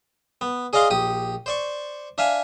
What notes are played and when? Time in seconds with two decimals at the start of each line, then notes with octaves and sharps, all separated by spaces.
0.41 B3
0.73 G#4 D5 D#5 F5 C6 D6
0.90 A#1 G4 D#6
1.46 C5 D5 C#6
2.18 D4 E5 F5 G#5